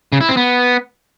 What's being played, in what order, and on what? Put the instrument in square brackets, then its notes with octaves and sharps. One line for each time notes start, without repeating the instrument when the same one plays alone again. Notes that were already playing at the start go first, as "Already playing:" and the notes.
[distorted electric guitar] C#3
E4
C4
B3